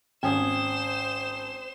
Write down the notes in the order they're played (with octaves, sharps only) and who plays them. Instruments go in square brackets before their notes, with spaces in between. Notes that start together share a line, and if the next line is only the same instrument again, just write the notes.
[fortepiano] G#1 C#4 G#5 [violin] C5 E7 [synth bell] G5 D#6